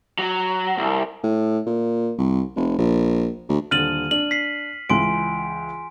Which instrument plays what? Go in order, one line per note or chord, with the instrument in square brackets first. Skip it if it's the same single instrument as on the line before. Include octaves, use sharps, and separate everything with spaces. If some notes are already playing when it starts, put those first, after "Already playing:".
[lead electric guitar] F#3
C2
[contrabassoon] A2
A#2
C2
F1
A#1
D2
[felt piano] D#1 D3 A6 [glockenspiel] F6 D#7 F#7
[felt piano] D4 [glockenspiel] F#7
[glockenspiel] B6 C7
[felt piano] C#2 E3 [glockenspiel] G#5 C6 D7